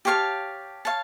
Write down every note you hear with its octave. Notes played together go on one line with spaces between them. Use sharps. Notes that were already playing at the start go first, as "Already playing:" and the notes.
G4 C#5 F5 A5
C#5 F5 A5